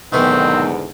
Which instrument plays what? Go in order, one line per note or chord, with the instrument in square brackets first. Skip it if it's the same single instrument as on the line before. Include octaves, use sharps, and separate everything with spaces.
[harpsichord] B1 A3 B3 [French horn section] E2 G#2 D3 [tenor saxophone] D#3 [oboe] C4